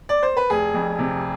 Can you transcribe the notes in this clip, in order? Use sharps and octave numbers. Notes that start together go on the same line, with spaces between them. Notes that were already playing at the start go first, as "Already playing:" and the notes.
D5
C5
B4
F1 G#4
F2
C3